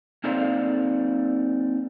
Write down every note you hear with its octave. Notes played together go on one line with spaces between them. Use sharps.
A#3 C4 D#4 A4 D5 F5